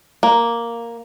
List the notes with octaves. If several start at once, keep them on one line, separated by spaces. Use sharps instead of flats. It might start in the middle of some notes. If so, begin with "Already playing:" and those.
A#3